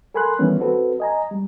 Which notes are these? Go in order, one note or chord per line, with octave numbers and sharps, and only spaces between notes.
A4 A#4 G#5 B5 C6 F#6
D#3 E3 G3 B3 C#4
C4 F#4 A4 B4
D#5 G#5 A#5
G3